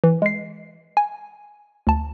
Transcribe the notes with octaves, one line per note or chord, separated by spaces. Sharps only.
E3
G#3 C7
G#5
D2 A5